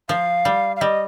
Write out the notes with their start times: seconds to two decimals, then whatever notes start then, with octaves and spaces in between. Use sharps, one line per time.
0.09 F3 F5
0.45 G3
0.76 F5
0.81 G3 D#5